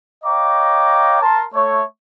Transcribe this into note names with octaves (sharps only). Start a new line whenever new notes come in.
C#5 D#5 F5 G5 A#5 D6
A#4 A5 C6
A3 C#5